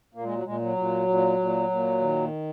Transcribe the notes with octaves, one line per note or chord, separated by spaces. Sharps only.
A#2 A#3
G#3
F#3
A#2 G#3
F#3
A#2
A#2
A#2
A#2
D#3